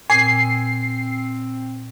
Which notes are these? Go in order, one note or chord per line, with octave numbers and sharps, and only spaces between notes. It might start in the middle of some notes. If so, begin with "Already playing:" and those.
A#2 C4 G#5 C7